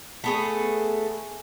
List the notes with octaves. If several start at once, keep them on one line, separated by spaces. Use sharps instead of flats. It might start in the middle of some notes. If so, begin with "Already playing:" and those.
A3 B3 G#4